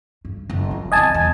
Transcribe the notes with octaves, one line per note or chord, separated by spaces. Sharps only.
G2
F#1
F3
D3 C4 D#5 G#5 A5
E2 F3